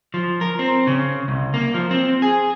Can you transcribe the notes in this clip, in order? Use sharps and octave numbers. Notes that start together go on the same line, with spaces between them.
F3
A#4
C4
C#3
C2
A#3
F3
C4
G#4